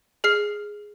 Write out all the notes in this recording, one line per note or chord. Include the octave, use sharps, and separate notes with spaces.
G#4 F6 C7